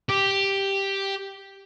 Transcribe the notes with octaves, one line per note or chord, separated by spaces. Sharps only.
G4